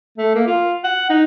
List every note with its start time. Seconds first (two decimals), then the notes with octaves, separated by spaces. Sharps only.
0.18 A3
0.35 A#3
0.47 F4
0.84 F#5
1.10 D#4